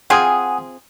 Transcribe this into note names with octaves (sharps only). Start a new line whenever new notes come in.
C4 F4 G#4 F#5 G#5 D#6